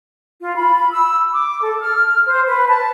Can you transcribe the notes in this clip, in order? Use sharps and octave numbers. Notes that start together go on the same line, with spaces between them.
F4
B5
E6
D6
A4
F6
C5
B4
A5